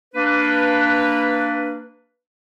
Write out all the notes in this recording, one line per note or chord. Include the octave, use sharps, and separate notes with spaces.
A#3 D4 B4